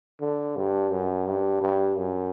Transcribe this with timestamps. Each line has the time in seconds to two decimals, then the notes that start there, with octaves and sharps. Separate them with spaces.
0.20 D3
0.56 G2
0.90 F#2
1.26 G2
1.61 G2
1.97 F#2